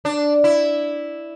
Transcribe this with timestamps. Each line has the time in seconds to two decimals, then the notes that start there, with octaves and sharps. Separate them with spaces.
0.05 D4
0.44 E4